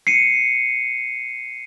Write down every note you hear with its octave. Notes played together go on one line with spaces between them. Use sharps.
C7 C#7 D#7